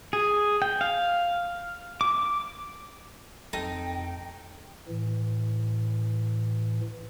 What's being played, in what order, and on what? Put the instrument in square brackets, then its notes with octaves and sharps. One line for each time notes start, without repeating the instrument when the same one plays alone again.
[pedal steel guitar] G#4
G5
F5
D6
[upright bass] F2 [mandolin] D#4 [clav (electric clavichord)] A4 [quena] G5
[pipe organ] A2 E3